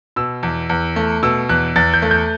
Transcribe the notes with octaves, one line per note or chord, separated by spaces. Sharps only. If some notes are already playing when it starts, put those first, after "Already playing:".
B2 E6
E2
E2
A3
B2 E6
E2 F#6
E2 A6
G6
A3
G6